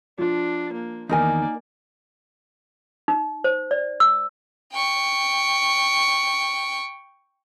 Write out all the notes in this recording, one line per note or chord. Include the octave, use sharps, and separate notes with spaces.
F3 D4 F4
A#3
E2 D#3 A#3 D#4 A#4 D5 G#5
D#4
C5
D5
E6
G5 C#6